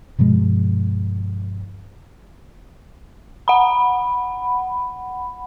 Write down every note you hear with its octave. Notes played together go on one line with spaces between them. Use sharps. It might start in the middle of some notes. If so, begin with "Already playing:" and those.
G2 B2 F3 G#3
F#5 B5